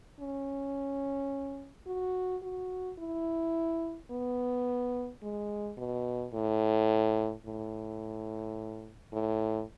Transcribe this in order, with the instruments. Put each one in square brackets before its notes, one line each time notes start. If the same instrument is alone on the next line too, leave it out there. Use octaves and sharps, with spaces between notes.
[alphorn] C#4
F#4
F#4
E4
B3
G#3
B2
A2
A2
A2